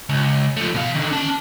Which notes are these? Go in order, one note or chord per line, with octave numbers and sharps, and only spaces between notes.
C#2
F3 A3
B2 F5
D3 D#3
C#4 A5